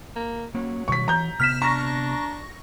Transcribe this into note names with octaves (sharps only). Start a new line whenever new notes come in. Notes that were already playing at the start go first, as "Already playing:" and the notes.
A#3
F#3 A#3 C#4
B2 D#3 G3 C#6 B6
E3 A#5 G6
C3 B3 F6 B6 E7
D4 A#5 C#6 A#6